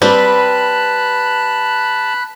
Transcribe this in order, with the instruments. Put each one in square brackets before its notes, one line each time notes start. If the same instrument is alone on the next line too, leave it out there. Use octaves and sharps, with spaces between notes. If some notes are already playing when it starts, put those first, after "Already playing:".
[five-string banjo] G3 C4 [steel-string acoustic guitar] B4 [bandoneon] A5 [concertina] B5 F#6